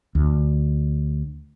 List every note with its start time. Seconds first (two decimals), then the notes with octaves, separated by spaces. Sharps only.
0.15 D2